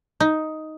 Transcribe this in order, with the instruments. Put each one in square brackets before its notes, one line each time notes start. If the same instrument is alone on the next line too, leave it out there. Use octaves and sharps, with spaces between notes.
[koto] D#4